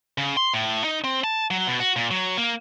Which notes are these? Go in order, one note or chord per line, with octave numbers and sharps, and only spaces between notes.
C#3
C6
A2
D#4
C4
A5
F#3
B2
F#4
A#2
F#3
A#3